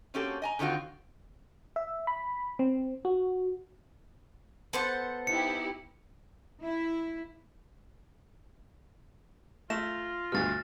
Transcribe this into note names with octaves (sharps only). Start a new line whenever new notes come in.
A#3 C4 C#4 F#4 G4 A4
D#5 G#5 A#5
D3 D#3 C4 F4 F#4
E5
B5
C4
F#4
B3 A4 C5 F#5
D#4 E4 G4 C#7
E4
A3 F4 A#6 E7
D2 G2 B2 F6 A6